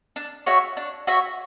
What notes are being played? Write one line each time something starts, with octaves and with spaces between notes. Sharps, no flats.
D4
F#4 C#5 E5
D4
F#4 C#5 E5